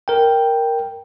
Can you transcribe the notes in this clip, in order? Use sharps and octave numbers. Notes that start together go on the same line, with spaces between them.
A#4 G5